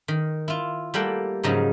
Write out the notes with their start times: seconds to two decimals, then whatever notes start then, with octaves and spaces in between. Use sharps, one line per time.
0.08 D#3
0.48 E4 F4
0.94 G3 A3 A#3 E4 F#5 G5
1.43 G#2 C#3 F3 F#3 G#3 D#4